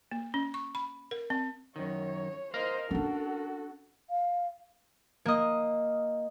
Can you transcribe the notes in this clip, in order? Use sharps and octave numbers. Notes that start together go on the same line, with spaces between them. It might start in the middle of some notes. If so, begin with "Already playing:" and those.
A#3
C#4
C#6
B5
A#4
C4
F#2 D#3 C#5
A#4 C5 D#5 F5
C#4 D4 F#4 A4
F5
A#3 D#5